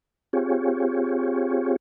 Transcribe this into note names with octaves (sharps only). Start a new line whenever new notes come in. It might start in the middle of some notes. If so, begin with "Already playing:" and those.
C4 F4 G4 G#4 C#5